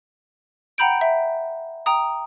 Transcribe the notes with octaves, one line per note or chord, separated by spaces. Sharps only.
F#5 G5 A#5 B5 G6 D7
E5
G5 A#5 D#6